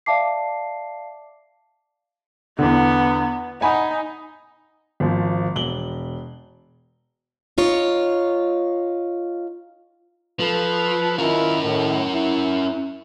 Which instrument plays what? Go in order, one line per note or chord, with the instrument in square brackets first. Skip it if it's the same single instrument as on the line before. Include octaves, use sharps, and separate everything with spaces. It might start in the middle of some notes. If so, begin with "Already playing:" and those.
[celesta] D5 E5 F5 A5 D6 C7
[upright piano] E2 D3 [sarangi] B3
[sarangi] D#4 [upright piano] F#5 G#5 B5
[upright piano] G#1 F3
E1 F#7 G7
[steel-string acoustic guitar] D#4 F4 C#5
[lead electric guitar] F3 [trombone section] A4 B4
[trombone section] D#3 E4 F4 [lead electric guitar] C#4 A#4
[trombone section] A2 D#3
E4